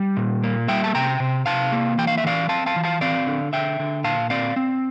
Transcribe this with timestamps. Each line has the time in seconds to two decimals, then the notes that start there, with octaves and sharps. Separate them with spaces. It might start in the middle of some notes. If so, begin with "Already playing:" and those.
Already playing: G3
0.17 A#2
0.44 A#3
0.68 G3 E5 G5
0.84 A5
0.95 C3 G5 A#5
1.20 C3
1.46 C3 F5 A5
1.72 A#3
1.98 E3 G5
2.07 F5
2.18 E5
2.24 E3 D5 F5
2.49 C4 F5 A5
2.66 F5 A5
2.76 E3
2.84 F5 A5
3.01 C4 D5 F5
3.27 D3
3.53 D3 E5 G5
3.79 D3
4.04 A#2 F5 A5
4.30 C4 D5 F5
4.56 C4